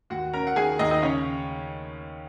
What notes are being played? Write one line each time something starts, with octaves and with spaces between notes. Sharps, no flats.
D#2 F#4 F#5
C#4 A#4 A#5
F#5
D#3 G#4 G#5
D#2 D#4 D#5
D#4 D#5
C#3 C#4 C#5